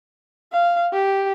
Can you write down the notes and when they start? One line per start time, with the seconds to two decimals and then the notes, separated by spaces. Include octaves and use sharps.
0.52 F5
0.93 G4